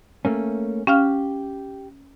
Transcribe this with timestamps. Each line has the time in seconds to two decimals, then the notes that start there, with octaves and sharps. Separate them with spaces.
0.25 A3 A#3 C#4
0.87 C#4 G4 F5 F6